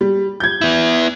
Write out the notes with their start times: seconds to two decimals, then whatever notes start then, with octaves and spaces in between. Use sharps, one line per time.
0.01 G3
0.40 G6 G#6
0.61 B3 E4